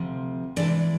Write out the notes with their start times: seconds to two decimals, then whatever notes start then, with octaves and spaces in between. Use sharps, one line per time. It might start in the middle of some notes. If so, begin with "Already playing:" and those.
Already playing: D2 C3 F3
0.56 E2 C3 E3 G#3 D4 D5